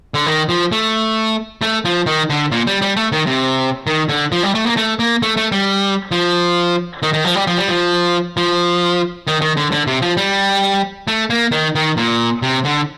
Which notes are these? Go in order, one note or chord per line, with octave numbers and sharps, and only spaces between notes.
D3
D#3
F3
A3
A3
F3
D#3
D3
A#2
G3
G3
A3
D#3
C3
D#3
D3
F3
G3
A3
A#3
A3
A#3
A3
A3
G3
F3
D#3
D#3
F3
G3
F3
G3
F3
F3
D#3
D#3
D3
D3
C3
F3
G3
A3
A#3
D#3
D#3
A#2
C3
D3